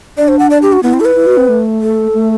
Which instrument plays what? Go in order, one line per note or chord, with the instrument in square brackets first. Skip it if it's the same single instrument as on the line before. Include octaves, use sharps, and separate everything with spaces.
[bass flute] D4 [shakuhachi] D5
[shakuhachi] C5
F#5
D5
G4
F#4
[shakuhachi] B3 [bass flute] E4
[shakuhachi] C4
A4
B4
[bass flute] E4
F#4
C4
A3
[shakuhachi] A4
[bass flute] A3